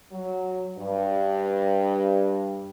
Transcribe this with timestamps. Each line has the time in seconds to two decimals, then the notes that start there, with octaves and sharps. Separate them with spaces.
0.12 F#3
0.78 G2